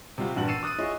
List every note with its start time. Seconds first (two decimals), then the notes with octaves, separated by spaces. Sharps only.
0.18 C3 G3 F4 F#4
0.36 A#1 E2 G2 F#4 F#7
0.48 E6 A6 C7 C#7 D#7 E7
0.63 D6 D#6 F#6 A6 D#7
0.79 E4 F4 G#4 C#5 D#5